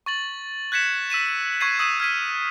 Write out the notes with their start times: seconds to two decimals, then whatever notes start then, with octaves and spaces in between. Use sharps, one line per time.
0.06 C#6 A6 F#7
0.72 F#6 G#6 B6 C#7 E7
1.10 E6 B6 D#7 E7
1.61 C#6 E6 G#6 C7 D#7
1.79 D#6 E6 B6 D#7 E7
2.00 F6 G#6 B6 D#7